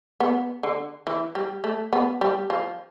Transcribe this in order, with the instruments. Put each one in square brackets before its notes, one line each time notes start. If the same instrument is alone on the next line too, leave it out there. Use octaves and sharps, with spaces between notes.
[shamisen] B3
D3
E3
G3
A3
B3
G3
F3